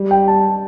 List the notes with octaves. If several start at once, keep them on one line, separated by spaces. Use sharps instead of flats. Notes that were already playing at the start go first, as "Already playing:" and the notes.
Already playing: G3
G5
A5